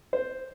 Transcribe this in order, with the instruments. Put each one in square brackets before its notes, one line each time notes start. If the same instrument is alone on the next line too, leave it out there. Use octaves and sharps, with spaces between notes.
[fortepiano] C5